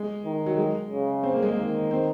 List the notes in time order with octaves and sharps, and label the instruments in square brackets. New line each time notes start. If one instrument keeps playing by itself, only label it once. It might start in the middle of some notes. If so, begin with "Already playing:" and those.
Already playing: [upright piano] G#3
[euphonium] D#3
[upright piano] F#3
G#3
[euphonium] C#3
[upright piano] C4
A#3
G#3
A#3
[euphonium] D#3
[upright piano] C4